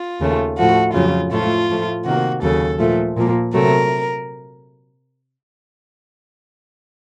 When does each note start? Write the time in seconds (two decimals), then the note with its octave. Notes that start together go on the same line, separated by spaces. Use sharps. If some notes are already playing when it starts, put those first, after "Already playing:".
Already playing: F4
0.20 D#2 C#3 A3
0.57 A2 F3 A3 F#4
0.94 F2 C#3 F#3 F4
1.31 A2 F3 A3 F4
1.69 A2 F3 A3
2.05 C3 D#3 A#3 F#4
2.42 D#2 C#3 F#3 A4
2.79 A#2 F3 A3
3.16 A#2 F3 A#3
3.53 C3 F#3 A3 A#4